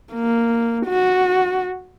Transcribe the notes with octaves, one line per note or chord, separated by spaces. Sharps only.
A#3
F#4